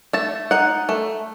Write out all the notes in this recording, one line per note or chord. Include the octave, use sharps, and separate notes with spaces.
A3 A5
D#4 F#5
A3